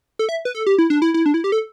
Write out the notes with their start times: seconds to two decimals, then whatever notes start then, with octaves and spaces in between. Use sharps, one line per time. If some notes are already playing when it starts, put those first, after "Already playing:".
0.19 A4
0.29 E5
0.45 B4
0.55 A4
0.67 G4
0.78 E4
0.90 D4
1.02 E4
1.14 E4
1.26 D4
1.34 E4
1.44 G4
1.52 A4